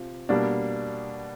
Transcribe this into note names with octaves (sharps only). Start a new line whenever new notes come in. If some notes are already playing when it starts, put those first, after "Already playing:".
Already playing: C3 F3
B2 G3 A#3 D4